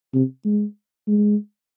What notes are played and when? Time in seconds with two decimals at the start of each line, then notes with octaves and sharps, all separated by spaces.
0.14 C3
0.45 G#3
1.07 G#3